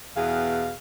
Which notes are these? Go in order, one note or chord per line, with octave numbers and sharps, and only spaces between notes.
E2 B2 G#4 F5